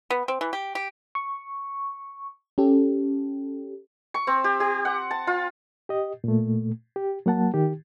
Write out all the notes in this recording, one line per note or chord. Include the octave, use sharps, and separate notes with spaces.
B3
C4
E3
G4
G4
C#6
C#4 G4 A4
C#6
C4
G4
G4
F#5
A5
F4
G4 D#5
A#2 A3
G4
F#3 A#3 F#5 A5
D#3 G4